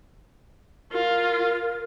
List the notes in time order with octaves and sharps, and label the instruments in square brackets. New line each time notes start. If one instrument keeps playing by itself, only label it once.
[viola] F4 [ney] A#4